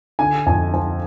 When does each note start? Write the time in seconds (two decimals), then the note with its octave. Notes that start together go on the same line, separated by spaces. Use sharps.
0.19 D3 G#5
0.46 F2 G#5
0.73 F3 G#5